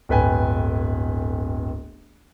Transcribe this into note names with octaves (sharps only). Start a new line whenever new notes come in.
D1 G1 B4 G5 G#5